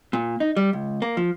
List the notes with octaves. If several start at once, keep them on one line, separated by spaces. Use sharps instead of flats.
A#2
D#4
G3
C#2
A#3
F3